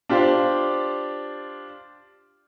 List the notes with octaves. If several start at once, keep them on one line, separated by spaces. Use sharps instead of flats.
D4 F4 G4 C5 D5